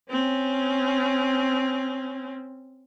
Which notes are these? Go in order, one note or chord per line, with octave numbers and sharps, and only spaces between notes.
C4 C#4